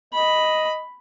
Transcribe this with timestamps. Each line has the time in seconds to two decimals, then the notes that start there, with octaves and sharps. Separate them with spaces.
0.14 D#5 B5